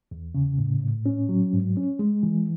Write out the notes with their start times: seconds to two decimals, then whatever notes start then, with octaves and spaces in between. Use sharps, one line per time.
0.11 E2
0.35 C#3
0.58 A2
0.82 A2
1.06 C#4
1.29 F#3
1.53 G#2
1.77 C#4
1.99 G#3
2.23 E3